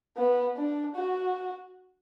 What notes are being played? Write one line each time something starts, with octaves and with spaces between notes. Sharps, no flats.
B3
D4
F#4